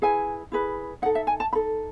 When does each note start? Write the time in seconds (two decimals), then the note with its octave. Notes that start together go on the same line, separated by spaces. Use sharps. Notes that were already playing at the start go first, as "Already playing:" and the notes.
0.02 E4 G#4 B4 G#5
0.52 E4 G#4 B4
1.02 D#4 F#5
1.06 A4
1.15 E5
1.27 G#5
1.40 A5
1.52 D#4 B5
1.55 A4